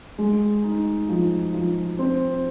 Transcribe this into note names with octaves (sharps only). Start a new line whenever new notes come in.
G#3
D#4
F3
F3
C4